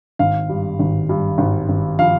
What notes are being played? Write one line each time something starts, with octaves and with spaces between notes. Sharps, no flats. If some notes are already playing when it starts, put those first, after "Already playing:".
G#1 F5
G2
G#1
G2
G#1
G#1
F3 F5